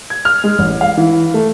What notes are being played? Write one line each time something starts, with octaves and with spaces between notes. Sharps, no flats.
G#6
F6
G#3
A1
F5
E3
A3